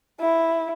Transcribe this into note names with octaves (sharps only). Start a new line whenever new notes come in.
E4